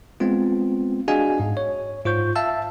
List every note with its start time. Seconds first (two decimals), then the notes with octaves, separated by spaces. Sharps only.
0.20 G#3 B3 C4 F4
1.08 D4 F#4 G#4 D#5 F5 G#5
1.40 G#2
1.57 C#5
2.05 G#2 F4 C5 C#6 G6
2.36 E5 F5 A5 E6